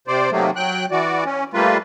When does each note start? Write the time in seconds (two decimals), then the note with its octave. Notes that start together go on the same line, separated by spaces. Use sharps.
0.07 C3 C5 D5
0.30 C3 D#3 F#3 A3 A#3
0.56 F#3 G5 F#6
0.91 E3 F#4 D5
1.25 C#4
1.53 G3 A3 A#3 F4 B4